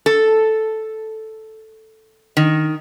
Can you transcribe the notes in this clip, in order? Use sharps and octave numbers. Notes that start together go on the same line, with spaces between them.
A4
D#3